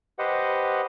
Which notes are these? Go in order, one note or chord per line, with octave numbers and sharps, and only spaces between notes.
G4 B4 C5 D#5 F#5